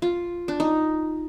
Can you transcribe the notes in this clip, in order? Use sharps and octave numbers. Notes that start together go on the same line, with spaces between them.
F4
D4
D#4